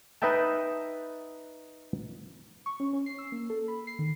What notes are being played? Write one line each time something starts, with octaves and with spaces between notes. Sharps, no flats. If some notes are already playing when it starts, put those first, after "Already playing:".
D#4 B4 D#5 E5 G5 A5
C#6
C#4
C#4
C7
E6
A#3
A4
B5
C7
D#3